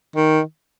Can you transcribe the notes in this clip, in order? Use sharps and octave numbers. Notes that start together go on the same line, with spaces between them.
D#3